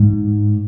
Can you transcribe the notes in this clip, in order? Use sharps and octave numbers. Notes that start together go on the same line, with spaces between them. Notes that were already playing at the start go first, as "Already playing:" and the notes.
Already playing: G#2